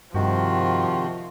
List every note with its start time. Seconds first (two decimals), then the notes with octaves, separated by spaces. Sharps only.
0.15 G2 C3 D#3 F3 F#4